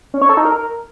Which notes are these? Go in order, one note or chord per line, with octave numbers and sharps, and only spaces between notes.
C#4
C#5
A4
D#4
A#4